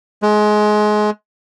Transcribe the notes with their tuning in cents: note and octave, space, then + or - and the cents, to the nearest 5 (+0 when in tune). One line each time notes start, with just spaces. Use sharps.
G#3 +25